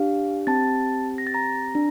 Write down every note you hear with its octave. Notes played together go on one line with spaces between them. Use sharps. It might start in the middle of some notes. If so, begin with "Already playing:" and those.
Already playing: D4 G4 F5
C4 G4 A5 A6
A#6
A6
A#5 A#6
D4